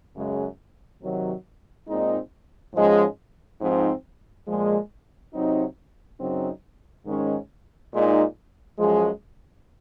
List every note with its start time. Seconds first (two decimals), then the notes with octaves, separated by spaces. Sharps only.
0.15 F#2 C#3 G#3
1.02 C3 D#3 F#3
1.88 A#2 G#3 C4 D#4
2.74 G#2 F3 G#3 C#4
3.60 G#2 F3 C4 D#4
4.48 A#2 F3 G#3
5.33 C3 F#3 C4 D#4
6.19 F#2 C#3 F#3 C4 D#4
7.06 G#2 D#3 G#3 C#4
7.93 A#2 G#3 D#4
8.78 F#2 F3 G#3